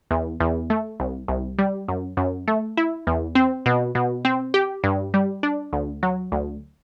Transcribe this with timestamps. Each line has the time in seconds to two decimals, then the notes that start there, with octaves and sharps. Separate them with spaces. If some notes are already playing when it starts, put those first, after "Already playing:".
0.11 E2
0.40 E2
0.70 A3
1.00 C2
1.28 C2
1.59 G3
1.88 F#2
2.17 F#2
2.48 A3
2.77 E4
3.07 E2
3.35 C4
3.66 B2
3.95 B2
4.25 C4
4.54 G4
4.84 G2
5.14 G3
5.43 D4
5.73 D2
6.03 F#3
6.32 D2